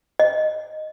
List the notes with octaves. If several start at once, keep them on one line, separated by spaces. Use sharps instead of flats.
D#5